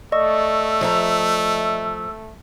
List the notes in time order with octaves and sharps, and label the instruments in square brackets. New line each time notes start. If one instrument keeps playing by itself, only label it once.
[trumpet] A3 [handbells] D5 D#5 C#6 [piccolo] E6
[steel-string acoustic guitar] F3 E5 A#5